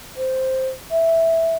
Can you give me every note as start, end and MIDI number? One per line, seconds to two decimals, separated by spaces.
0.17 0.68 72
0.91 1.56 76